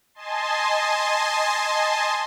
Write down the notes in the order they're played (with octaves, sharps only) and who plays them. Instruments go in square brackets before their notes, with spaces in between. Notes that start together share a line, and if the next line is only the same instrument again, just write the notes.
[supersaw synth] D#5 G#5 A5 C6